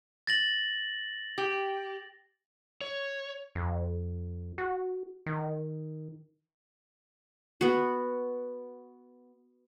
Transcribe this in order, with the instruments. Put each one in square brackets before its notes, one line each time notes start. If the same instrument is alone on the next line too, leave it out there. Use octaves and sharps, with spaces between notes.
[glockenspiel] A6 A#6 F#7
[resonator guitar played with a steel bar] G4
[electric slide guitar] C#5
[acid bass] F2
F#4
D#3
[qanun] B3 F#4